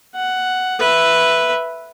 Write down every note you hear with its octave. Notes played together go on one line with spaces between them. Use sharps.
F#5
B4 E5